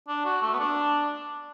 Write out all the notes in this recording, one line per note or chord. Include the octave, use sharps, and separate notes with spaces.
D4
F#4
A3
B3
D4